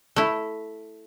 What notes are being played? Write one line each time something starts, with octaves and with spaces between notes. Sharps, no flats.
A3 E4